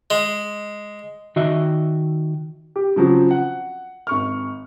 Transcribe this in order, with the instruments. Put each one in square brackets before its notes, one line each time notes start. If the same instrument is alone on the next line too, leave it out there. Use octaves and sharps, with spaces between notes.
[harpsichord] G#3
[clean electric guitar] D#3 F#4 D#5 E5
[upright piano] G4
C#3 F3 F#3 C4
F#5
G#1 C#6 F6